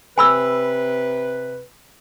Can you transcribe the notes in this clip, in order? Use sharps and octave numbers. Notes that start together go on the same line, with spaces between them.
C3 B4 G#5 B5 E6